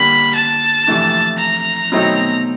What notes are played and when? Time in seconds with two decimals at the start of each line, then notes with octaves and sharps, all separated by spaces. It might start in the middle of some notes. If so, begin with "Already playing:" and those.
Already playing: D3 G3 A#3 B5
0.36 A5
0.87 F2 C3 E3 A3 D4
1.39 A#5
1.92 B2 F#3 A3 C4 D#4